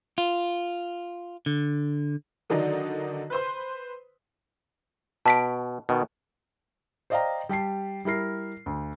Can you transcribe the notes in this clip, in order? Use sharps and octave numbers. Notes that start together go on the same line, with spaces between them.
F4
D3
D3 D#3 F#3 D4 D#4
B4 C5 C6
B2 A5 B6 D7
B2 D#3
C5 D5 D#5 F5 G5 A#5
G3 G4 A5 C7
G3 E4 A#4 C7
D2